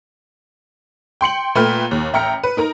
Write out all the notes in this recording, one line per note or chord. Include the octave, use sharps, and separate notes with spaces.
G5 C6 C#7 F#7
A#2 A3 B4 G5 F6
D#2
A1 E5 G5 A#5 F6 C#7
B4
D#4 A#4 A#5